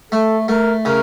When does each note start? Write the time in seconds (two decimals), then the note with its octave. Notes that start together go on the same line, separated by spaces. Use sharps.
0.12 A3 A4
0.48 A3 A#4
0.85 C#3 A#4